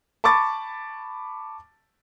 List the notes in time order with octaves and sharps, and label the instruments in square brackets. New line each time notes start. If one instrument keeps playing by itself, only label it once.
[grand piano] A5 B5 C#6 D6 A6